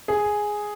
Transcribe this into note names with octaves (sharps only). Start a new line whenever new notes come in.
G#4